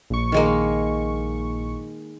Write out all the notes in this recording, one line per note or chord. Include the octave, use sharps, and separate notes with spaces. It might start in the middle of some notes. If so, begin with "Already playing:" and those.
A#1 C#6
D#3 G#3 A#3